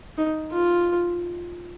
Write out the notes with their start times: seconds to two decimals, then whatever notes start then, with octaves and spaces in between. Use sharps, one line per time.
0.18 D#4
0.53 F4